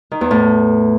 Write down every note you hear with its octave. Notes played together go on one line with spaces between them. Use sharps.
D#3
E2
A2